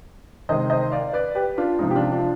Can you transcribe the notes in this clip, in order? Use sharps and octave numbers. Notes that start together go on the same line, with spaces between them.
C3 D#3 G#3 C5 D#5
C5 D#5
D5 F5
B4 D5
G4 B4
D4 F4
C3 F3 G#3 D#4
G4
D4 F4
D4 F4